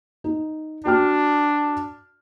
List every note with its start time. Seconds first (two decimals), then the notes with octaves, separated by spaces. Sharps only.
0.24 D#4
0.85 D4 F#4 G5 F6